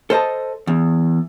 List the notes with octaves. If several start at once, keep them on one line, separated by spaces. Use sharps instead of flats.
A4 C5 D#5 A5
E2